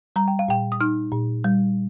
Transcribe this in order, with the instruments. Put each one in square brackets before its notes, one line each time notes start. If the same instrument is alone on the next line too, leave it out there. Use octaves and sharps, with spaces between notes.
[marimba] G3 A#5
G5
F5
A#2 G5
D#6
D#4 F6
A#2
G3